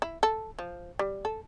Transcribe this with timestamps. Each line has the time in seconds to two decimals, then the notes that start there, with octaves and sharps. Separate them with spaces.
0.02 E4
0.23 A4
0.59 F3
0.99 G3
1.25 A4